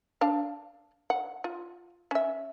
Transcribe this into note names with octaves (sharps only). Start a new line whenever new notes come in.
D4 F5
F#5
F4
C#4 E5